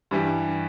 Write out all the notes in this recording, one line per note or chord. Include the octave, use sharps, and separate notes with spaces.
G2 E3 G3